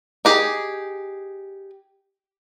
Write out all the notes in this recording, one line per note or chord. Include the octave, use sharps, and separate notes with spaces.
D#4 G4 G#4